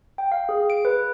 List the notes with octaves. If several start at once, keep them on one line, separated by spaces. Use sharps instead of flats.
G5
F5
G#4
D7
B4